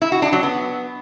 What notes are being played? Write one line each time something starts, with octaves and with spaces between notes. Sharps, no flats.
E4
F#4
D4
F#3
B3